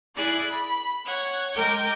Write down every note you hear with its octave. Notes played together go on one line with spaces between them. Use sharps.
E4 G#4 D5 D6 F#6
B5
C#5 F#5 G#6
G#3 A#4 G5 D6 G6